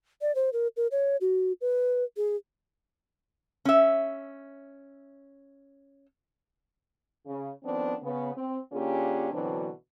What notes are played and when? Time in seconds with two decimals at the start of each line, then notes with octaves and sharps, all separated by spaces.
0.22 D5
0.35 C5
0.53 A#4
0.77 A#4
0.92 C#5
1.21 F#4
1.61 B4
2.17 G#4
3.65 C#4 E5
7.26 C#3
7.63 D#3 F3 B3 C4 D4
8.02 C#3 B3
8.35 C4
8.72 D3 A#3 C#4 F4 G4 G#4
9.31 B2 D3 E3 F#3 C4 D4